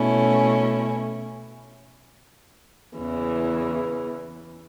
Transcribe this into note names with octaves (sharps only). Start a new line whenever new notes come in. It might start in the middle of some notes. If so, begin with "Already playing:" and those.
Already playing: B2 A3 C#4 E4
E2 C#3 E3